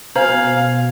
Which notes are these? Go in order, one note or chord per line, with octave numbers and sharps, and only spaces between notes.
B2 C5 F5 G#5 A#5 G#6 F#7